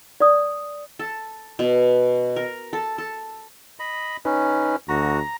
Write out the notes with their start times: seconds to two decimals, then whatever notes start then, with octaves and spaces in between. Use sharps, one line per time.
0.20 D5 D#6
0.99 A4
1.59 B2
2.36 A#4
2.73 A4
2.98 A4
3.80 D#5 B5
4.25 C#4 D#4 B4
4.89 D2 F#4 A#5